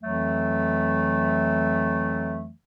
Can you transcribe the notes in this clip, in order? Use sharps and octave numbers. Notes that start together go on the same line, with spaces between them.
F2 E3 F#3 A3